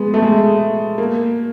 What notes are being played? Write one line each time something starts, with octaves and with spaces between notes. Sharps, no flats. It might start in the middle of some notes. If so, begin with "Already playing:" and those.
Already playing: G#3 B3
A3
G#3
A#3